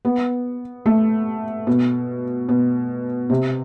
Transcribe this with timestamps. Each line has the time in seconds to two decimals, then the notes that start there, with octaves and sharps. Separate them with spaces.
0.05 B3
0.86 A3
1.67 B2
2.49 B2
3.30 C3